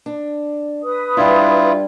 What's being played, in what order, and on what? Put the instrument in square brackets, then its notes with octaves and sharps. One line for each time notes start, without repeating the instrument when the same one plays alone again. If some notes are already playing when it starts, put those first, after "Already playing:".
[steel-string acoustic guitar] D4
[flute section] B4 D#6
[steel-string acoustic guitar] G3 D4 [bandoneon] E4 F4